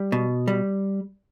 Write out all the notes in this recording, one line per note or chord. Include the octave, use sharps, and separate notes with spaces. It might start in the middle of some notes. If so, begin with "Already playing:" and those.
Already playing: G3
B2
G3